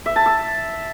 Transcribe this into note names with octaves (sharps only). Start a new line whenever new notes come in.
E5
A5
E6